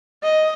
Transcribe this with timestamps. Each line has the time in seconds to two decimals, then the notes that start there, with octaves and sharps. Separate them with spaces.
0.23 D#5